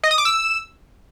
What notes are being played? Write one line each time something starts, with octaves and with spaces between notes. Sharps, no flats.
D#5
D#6
D6
E6